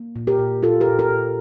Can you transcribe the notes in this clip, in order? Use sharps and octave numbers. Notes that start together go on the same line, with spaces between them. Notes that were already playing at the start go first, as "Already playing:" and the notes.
Already playing: A#3
A#2
G4 A#4
A#2
A#2 F4 A4
G4 A#4
A#2
G4 A#4
A#2